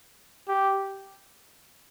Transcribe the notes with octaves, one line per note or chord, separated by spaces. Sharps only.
G4